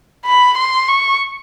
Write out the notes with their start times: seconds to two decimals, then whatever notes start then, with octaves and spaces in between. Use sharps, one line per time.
0.26 B5
0.58 C6
0.88 C#6